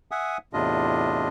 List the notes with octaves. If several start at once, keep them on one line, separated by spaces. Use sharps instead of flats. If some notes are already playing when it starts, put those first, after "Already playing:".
E5 F#5 G#5 D#6
E2 A2 C3 D4 F4 D#5